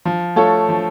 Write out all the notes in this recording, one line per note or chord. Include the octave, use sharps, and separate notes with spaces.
F3
A3 F4 A4 C#5
F3